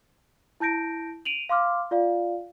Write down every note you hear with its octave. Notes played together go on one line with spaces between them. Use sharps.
E4 A5 G6 A#6 D7
D7 D#7 F7 F#7
F5 C6 D6 F6
F4 D5 F5